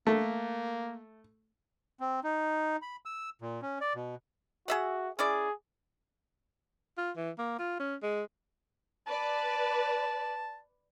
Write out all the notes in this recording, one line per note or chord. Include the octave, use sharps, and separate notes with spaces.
A3 A#3
C4
D#4
B5
E6
A#2
C#4
D5
B2
F#4 G#4 E5 F#5
C#4 E4 G#4 D5
F4
E3
A#3
F4
C#4
G#3
B4 D5 A5